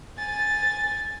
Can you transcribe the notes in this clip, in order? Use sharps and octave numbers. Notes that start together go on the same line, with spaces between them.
G#5 A6